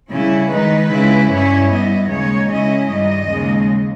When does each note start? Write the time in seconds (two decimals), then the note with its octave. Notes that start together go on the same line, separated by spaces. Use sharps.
0.11 C#3 G3 C#4 E4
0.51 D#3 G#3 D#4 B4
0.91 C#3 G#3 C#4 E4
1.31 G2 G3 C#4 E4 C#5
1.71 G2 G3 B3 E4 D#5
2.10 D#2 C#3 G#3 D#4 C#5
2.51 C#3 G#3 C#4 E4 D#5
2.91 G2 D#3 G3 D#5
3.31 D#2 C#3 G#3